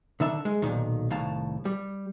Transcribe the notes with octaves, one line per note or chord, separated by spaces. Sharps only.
D3 D#3 E5 A5
G#3
B1 G2 A#2 D#3
C2 A2 D#3 F5 A5
G3